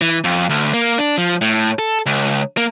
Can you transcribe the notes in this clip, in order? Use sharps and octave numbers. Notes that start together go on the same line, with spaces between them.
E3
F2
D2
A#3
D4
F3
A2
A4
C#2
A#3